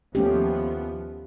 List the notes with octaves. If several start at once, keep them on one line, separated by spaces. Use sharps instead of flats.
D#2 F3 A3 B3 C#4 G4